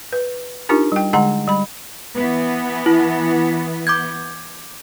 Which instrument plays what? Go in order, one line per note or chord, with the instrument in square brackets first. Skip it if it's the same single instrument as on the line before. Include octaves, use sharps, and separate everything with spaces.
[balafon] B4
D4 D#4 F4 G4 A#4
G3 G5
D3 G#3 F#5 A#5 C6
G3 B5
[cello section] E3 B3
[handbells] E4
D6 G6 G#6